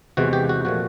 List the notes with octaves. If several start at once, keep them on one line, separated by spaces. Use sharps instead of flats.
E2 C3 E3 G#3 F#4
G4
F#4
A#2 F3 A3 F#4